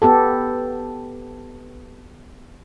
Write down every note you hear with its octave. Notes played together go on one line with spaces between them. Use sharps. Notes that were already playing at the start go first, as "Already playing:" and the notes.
B3 G4 A4